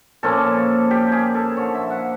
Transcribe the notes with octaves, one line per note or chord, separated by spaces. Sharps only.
A#2 F3 A#3 C#4 A4
G4
G#4
A4
D3 F3 A#3 C#5
E5
F#5